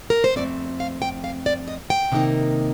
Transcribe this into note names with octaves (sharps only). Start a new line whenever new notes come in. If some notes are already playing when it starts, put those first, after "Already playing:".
A#4
C5
F2 D#3 A3 C4 D5
F5
G5
F5
D5
D#5
G5
C3 D#3 A#3 D#4